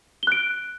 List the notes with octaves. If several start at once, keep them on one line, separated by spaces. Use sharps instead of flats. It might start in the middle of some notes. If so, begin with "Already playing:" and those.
F#6 D7 G7